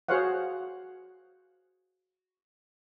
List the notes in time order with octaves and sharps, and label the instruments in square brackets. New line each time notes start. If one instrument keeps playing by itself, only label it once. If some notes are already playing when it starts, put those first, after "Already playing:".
[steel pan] F#4 G#4 C5 C#5 F5 F#5